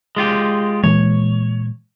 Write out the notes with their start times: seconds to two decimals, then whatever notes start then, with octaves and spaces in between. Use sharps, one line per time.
0.16 G#3 F4 G4
0.84 A#2 E3 G#3 C#5